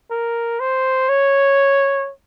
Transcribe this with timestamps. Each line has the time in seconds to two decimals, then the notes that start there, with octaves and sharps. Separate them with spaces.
0.11 A#4
0.60 C5
1.09 C#5